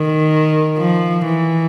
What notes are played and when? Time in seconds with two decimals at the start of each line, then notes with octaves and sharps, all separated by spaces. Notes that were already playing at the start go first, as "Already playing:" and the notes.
Already playing: D#3
0.78 F3
1.25 E3